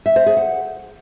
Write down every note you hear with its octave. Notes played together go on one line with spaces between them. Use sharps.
E5
C5
G#4
F#5